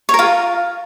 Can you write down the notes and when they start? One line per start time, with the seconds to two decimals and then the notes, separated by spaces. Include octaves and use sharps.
0.09 C#5
0.14 A#4
0.19 F4